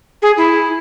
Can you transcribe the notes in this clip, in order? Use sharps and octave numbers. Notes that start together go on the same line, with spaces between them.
G#4
E4